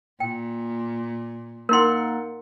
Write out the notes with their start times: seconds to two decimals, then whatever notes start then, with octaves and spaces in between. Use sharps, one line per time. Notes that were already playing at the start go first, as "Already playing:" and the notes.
0.20 A#2 G5
1.69 A#3 D#4 A#4 F#5 C6